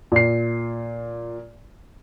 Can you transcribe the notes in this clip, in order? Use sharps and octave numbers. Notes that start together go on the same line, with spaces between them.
A#2 C7